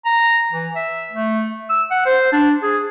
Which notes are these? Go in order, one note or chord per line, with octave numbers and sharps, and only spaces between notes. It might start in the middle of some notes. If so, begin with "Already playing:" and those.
A#5
E3
E5
A3
E6
F#5
C5
D4
G#4